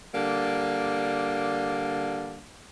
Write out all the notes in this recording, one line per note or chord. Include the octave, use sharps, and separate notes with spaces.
D3 G3 A#3